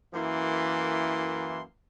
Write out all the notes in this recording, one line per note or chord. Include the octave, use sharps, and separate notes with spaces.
F#2 E3 A#3 E4 C6